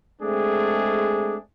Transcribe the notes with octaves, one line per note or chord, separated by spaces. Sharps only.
G#3 A3 C4 D4 G#4